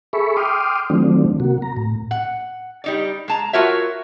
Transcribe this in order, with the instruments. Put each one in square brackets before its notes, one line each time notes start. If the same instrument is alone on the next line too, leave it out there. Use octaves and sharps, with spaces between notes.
[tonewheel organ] G#4 A4 E5 B5 C#6
G5 C6 D6 D#6 F6
D#3 F3 F#3 A3 C4 D4
C3 A#3 F#4
A#5
A2
[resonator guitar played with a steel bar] F#5
G3 D#4 D5
G#3 A5 A#5
F4 F#4 A#4 C#5 E5